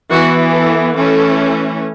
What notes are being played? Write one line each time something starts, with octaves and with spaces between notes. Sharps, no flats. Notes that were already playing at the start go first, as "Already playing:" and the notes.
E3 B3 F#4
A4
E3 A3 C#4 A4